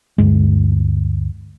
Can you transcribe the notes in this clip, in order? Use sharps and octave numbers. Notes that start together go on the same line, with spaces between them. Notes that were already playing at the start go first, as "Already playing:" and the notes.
D2 G2 G#3